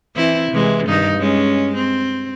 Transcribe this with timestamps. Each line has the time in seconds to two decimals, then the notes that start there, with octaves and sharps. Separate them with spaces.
0.16 E3 C4 E4
0.52 C3 E3 G#3
0.86 G2 D#3 D#4
1.18 G#3 C#4
1.75 C4